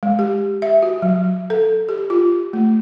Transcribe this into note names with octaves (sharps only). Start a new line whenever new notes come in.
G#3
G4
E5
F#4
F#3
A4
G4
F4
A3